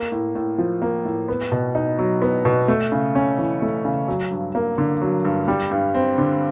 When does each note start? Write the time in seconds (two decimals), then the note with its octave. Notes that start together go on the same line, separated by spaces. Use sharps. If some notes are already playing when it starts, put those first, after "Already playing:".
Already playing: A#3
0.12 A2
0.35 A2
0.58 F3
0.82 A#3
1.05 A2
1.28 B3
1.52 B2
1.75 D#4
1.99 F#3
2.22 B3
2.45 B2
2.68 A3
2.92 C#3
3.15 C#4
3.38 E3
3.62 A3
3.85 C#3
4.08 F#3
4.31 G2
4.55 A#3
4.78 D3
5.02 F#3
5.25 G2
5.48 G3
5.71 G2
5.94 C4
6.18 D3